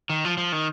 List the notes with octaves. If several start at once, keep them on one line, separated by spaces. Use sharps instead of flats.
D#3
F3
F3
D#3